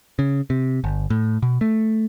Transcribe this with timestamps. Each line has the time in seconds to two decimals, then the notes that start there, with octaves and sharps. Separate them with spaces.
0.19 C#3
0.50 C3
0.84 G1
1.10 A2
1.43 B2
1.61 A3